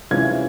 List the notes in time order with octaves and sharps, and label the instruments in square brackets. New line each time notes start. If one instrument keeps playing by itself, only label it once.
[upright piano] C3 E3 G#3 C#4 F4 G#6